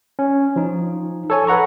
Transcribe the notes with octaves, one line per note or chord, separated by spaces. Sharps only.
C#4
F3 D#4
A4 C#5 G#5
A4 B4 F#5 A#5 C#6